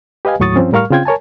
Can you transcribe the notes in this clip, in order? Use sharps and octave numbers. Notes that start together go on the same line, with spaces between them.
G4 B4 D#5 F5 G#5
D#2 A2 F#3 C#6 D#6 A6
G2 F3 C4 C#4
A2 G3 A#4 F5 C#6 F6
C#3 C4 F4 G5 G#6
A#4 C#5 G#5 A5